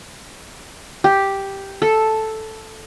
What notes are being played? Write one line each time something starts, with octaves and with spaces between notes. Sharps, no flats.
G4
A4